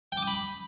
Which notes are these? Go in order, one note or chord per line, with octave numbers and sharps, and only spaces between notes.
G5
D6
D#6
B5